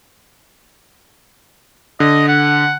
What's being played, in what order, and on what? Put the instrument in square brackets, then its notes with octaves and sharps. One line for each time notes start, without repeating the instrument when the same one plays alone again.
[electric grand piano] D3 [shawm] D#5
[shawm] F#5